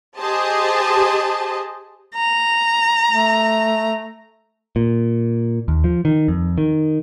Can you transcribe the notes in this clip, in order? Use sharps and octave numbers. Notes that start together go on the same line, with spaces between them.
G4 G#4 C5 D#5 A5
A#5
A3
A#2
D#2
F3
D#3
F2
D#3